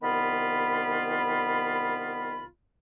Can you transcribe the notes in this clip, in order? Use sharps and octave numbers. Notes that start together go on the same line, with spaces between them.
C2 D#3 B3 F4 B5